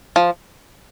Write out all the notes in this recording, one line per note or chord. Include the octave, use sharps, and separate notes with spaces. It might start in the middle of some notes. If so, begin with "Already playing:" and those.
F3